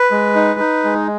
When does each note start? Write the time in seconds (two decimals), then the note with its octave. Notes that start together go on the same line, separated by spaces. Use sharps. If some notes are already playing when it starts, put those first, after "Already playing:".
Already playing: B4
0.11 G#3
0.35 D#4
0.60 D#4
0.84 G#3